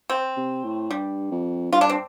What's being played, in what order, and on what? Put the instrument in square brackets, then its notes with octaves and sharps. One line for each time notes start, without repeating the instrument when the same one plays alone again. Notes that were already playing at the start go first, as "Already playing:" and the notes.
[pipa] C4
[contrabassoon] C3
A2
[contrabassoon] G2 [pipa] G3
[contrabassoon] F2
[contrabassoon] G2 [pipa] F4
[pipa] D4
C4